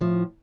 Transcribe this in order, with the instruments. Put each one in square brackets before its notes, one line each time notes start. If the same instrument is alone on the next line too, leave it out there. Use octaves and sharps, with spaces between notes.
[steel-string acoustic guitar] A2 F3